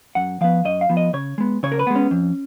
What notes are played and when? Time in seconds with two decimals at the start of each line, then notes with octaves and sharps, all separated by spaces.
0.15 F#2 F#5
0.41 F3 B3 F5
0.65 F#2 D#5
0.81 F5
0.89 F3 B3
0.97 D#5
1.13 C#3 C#5
1.38 G#3 B3
1.63 C#3 C#5
1.72 A#4
1.79 B4
1.87 G#3 B3
1.96 C#4
2.11 F2